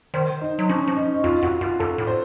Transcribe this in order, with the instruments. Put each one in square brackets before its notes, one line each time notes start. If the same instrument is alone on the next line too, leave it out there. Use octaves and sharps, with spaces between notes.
[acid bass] D#3 [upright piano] C5
[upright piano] D#4
[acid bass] F#3
[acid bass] F3 [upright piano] C#4
[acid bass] F3
[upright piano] D#4
D#4
[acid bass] F2 [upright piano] F4
[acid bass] F2 [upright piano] F#4
[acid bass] F#2 [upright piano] F4
[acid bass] F#2 [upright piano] A4
[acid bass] A2
[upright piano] C5